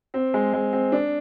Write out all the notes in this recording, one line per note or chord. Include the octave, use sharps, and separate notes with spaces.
C4
G#3
G#3
C4
D4